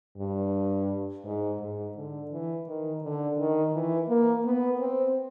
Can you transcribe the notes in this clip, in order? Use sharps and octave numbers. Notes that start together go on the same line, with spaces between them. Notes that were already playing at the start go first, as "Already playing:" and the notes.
G2
G#2
G#2
D3
E3
D#3
D3
D#3
E3
A#3
B3
C4